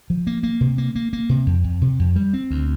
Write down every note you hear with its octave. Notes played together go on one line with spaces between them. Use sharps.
F3
A#3
A#3
C3
A#3
A#3
A#3
C3
F2
F2
C3
F2
G3
C4
D2